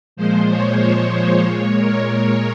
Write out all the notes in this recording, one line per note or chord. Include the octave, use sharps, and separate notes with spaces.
A#2 F3 G#3 C5
C#5
C#5
A#2 G#3
A#4
A#4